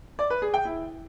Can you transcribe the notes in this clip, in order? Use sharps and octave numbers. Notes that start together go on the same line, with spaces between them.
D5
B4
G#4
G5
E4